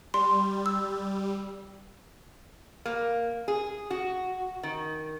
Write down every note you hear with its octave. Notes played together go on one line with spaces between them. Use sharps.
G3 C6
E6
A#3
G#4
F#4
D#3